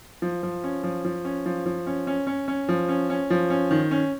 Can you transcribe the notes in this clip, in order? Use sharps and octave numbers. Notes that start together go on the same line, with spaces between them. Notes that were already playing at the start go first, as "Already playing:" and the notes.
F3
F3
C#4
F3
F3
C#4
F3
F3
C#4
C#4
C#4
C#4
F3
C#4
C#4
F3
C#4
D#3
C#4